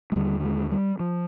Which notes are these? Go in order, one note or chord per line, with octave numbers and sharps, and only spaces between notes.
G#3
D#2 D3 G3
G#3
G3
F3